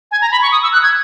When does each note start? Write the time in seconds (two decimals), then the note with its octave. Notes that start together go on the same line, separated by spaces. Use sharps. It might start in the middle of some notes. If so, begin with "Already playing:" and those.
0.11 G#5
0.22 A#5
0.32 B5
0.42 C#6
0.52 D#6
0.63 E6
0.73 F#6
0.83 G#6